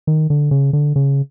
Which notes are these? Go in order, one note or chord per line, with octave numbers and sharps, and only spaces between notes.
D#3
D3
C#3
D3
C#3